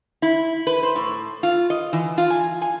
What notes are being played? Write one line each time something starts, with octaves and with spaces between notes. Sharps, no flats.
E4
B4
C5
A2
F4
D#5
E3
F4
G#5
G#5